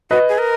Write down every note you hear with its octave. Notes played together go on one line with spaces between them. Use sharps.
F#4 B4 D#5
G#4
A#4